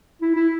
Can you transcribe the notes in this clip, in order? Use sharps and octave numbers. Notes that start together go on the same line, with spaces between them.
E4
E4